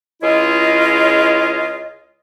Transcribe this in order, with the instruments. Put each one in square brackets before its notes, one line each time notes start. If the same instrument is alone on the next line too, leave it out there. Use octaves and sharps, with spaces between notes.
[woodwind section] C#2 E4 F4 G#4 D#5